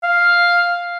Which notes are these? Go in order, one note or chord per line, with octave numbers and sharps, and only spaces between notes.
F5